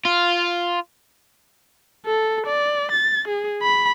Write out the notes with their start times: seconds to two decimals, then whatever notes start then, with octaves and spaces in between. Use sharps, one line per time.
0.05 F4
2.06 A4
2.47 D5
2.92 A6
3.28 G#4
3.62 B5